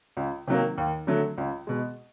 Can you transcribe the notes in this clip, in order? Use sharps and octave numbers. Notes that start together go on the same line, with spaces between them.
C#2
C3 D#3 F#3 A#3
D#2
D3 F#3 A3
C#2
B2 G#3